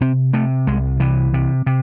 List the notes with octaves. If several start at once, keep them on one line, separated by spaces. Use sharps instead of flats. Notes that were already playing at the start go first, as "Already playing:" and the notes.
C3 C4
C3 A3
C2 G#3
C3 E3
C3
C3